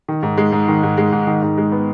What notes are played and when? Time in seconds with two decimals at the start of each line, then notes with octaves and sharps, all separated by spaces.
0.09 D#3
0.23 G#2
0.37 G#3
0.52 G#2
0.68 D#3
0.83 G#2
0.97 G#3
1.12 G#2
1.27 D#3
1.42 G#2
1.58 G#3
1.72 B3